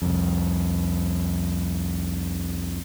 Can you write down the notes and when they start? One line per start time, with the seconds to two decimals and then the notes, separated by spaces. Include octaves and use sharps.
0.02 C2 F2